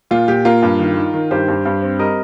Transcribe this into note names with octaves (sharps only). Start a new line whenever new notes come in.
A#2 F4
A#2 G4
A#3 F4 A#4
G2
D#3
D#3
D#3
G2 G4 C5
G2
G2
C4
G3 A#4 D#5